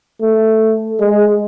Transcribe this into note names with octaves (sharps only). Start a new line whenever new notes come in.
A3
G#3